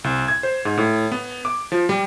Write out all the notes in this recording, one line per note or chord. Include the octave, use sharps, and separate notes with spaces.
C2
G#6
C5
G#2
A2
B3
D6
F3
G3